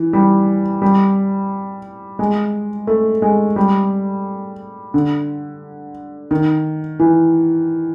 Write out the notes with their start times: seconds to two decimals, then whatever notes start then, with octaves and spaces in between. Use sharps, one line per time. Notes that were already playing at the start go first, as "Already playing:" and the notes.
Already playing: E3
0.13 G3
0.82 G3
2.19 G#3
2.87 A3
3.22 G#3
3.56 G3
4.94 D3
6.31 D#3
6.99 E3